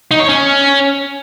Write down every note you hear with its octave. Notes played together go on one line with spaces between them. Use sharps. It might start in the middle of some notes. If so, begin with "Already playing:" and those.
D#4
C#5
C#4